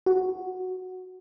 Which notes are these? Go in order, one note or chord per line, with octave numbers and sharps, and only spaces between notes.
F#4